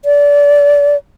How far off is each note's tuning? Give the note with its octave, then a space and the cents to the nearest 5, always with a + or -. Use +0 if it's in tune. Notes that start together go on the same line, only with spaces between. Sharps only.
D5 -25